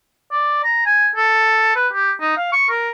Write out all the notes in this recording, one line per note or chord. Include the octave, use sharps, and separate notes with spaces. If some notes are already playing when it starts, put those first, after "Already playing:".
D5
A#5
G#5
A4
B4
G4
D#4
F5
C#6
A#4